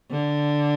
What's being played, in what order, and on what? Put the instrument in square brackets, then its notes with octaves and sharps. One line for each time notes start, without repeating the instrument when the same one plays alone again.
[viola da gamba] D3